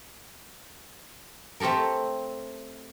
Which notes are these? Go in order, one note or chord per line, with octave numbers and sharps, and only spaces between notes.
A3 C4 G4 A4 A#4